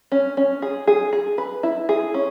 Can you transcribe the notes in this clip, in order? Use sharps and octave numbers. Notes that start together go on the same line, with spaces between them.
C#4
C#4
G#4
G#4
G#4
B4
E4
G#4
C#4